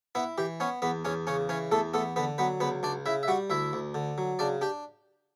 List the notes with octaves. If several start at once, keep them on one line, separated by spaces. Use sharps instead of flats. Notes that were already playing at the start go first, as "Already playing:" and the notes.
B3 E4 B4
E3 G4
B3 C#4 C#5
E2 B3 B4
E2 C#4 C#5
C#3 C#4 C#5
E3 C#4 C#5
E2 A3 A4
A3 B3 A4
D3 B3 B4
F#3 B3 B4
C#2 B3 B4
C#2 D4 D5
C#3 E4 E5
E5
G3 F#4 F#5
D2 E4 E5
D2
D3
F#3
C#3 D4 D5
D4 G4